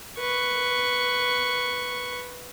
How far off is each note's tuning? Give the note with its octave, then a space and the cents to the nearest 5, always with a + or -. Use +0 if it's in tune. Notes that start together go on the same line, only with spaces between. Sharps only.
B4 +0 C#6 +0